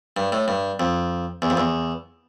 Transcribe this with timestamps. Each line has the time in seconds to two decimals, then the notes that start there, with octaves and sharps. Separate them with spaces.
0.17 G2
0.32 A2
0.48 G2
0.80 F2
1.42 E2
1.50 F2
1.57 E2